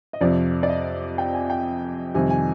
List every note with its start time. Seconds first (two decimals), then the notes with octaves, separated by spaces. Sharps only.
0.13 D#5
0.21 F2 C3 F3 D5
0.63 D5
0.69 D#5
1.18 G5
1.34 G#5
1.50 G5
2.14 F2 C3 D#3 G3 G#5
2.30 G#5